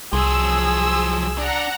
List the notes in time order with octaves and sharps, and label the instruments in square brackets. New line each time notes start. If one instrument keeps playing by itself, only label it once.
[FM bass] C2 [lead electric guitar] F3 F#3 [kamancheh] G#4 [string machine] E6
[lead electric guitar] D4 [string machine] F#5 A#5